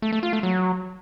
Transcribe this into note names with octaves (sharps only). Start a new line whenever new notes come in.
A3
A3
F4
A3
F#3